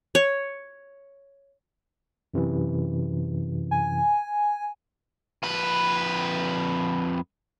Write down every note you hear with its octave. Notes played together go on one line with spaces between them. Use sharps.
C#5
F#2 C3 E3
G#5
F2 B4